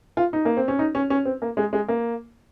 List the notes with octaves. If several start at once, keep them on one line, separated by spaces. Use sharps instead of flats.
F4
D#4
A#3
C4
C#4
D#4
C#4
C#4
C4
A#3
G#3
G#3
A#3